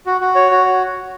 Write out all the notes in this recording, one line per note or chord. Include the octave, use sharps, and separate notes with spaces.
F#4
F#4
C#5
F#4